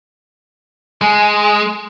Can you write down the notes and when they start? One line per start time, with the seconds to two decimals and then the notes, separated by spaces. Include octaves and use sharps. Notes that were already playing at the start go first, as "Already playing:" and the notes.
1.01 G#3 G#5